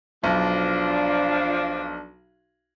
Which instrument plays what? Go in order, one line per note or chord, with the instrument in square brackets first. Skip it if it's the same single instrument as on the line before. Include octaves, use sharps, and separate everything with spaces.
[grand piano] B1 [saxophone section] F3 D4